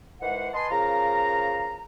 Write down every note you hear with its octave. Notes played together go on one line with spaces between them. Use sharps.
D#3 E3 G#3 C5 F#5
B4 D#5 G#5 A5 C6
C#3 F3 A#4 F5 A#5